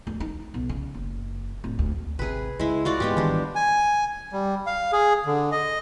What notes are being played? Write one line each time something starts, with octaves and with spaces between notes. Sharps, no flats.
D2
D#4
B1
C#3
F#1
D1
D2
G#1 C3 G#4 B4
C#2 G#3 E4
F4 F#4 D5
G#2 G#3 B3 G4
G#1 D#3 E3 G3 D4
G#5
G3
F5
G#4
D3
D#5